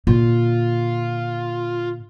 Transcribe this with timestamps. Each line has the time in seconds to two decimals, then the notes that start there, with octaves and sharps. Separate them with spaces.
0.07 A#2 D3 F4